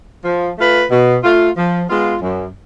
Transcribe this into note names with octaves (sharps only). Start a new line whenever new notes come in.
F3
A3 F4 B4
B2
A3 F4
F3
G#3 B3 F4
F#2